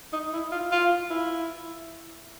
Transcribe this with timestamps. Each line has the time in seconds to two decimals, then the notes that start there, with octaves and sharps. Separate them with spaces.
0.13 D#4
0.33 E4
0.52 F4
0.72 F4
1.10 E4